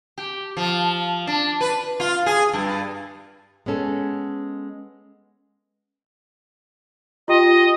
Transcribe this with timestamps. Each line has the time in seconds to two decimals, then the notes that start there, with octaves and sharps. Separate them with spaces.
0.18 G4
0.57 F3
1.27 D4
1.61 B4
2.00 F4
2.26 G#4
2.53 G2
3.66 G#3 B3 C#4 A4
7.28 F4 G4 D#5 G5